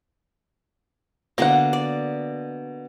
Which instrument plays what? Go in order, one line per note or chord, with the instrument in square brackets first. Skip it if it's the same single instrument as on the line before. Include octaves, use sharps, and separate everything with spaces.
[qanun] B2 D3 D4 [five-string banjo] A#3 F#5
[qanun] D5